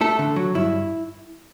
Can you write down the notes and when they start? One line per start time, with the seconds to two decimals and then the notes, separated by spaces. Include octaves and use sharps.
0.01 A3 A4
0.19 D3
0.36 F#3
0.55 G2 E4